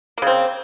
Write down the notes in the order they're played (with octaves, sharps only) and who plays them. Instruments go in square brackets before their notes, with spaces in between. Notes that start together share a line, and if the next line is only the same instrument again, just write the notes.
[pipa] A#3
C#3
C4